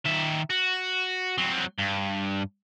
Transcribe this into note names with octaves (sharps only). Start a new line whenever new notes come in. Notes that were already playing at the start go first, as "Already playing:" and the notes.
D#3 E5
F#4
F#3 C4
G2